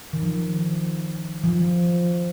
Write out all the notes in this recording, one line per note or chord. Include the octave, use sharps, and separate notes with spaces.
D#3
F3
F3